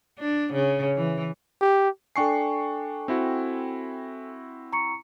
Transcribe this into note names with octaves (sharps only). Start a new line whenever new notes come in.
D4
C#3
E3
G4
D4 A4 G5 G#5 C#6 C7
C4 E4 F#4
A#5 C#6 C#7